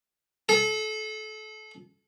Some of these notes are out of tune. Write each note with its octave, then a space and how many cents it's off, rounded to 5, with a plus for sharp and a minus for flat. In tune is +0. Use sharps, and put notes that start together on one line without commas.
A4 -30